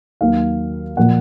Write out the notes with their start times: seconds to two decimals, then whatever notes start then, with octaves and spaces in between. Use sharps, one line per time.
0.21 D#2 D#3 F#3 A#3 F5
0.97 A#2 F3 A#3 F#5